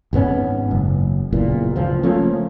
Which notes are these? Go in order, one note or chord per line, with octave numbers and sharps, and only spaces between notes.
G#1 G#2 B3 C#4
F#1
F#1 E2 A#2
C#2 F3
F3 A3 A#3 C#4